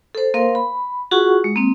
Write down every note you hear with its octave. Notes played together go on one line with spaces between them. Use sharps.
A4 C5
A#3 A#4 C5 F5 C6
B5
F4 F#4 G#4 F#5 C#6
G#3
A#3 C4